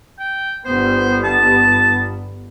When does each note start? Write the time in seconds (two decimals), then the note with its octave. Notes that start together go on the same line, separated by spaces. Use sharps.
0.19 G5
0.65 G1 G2 B3 C5
1.24 A5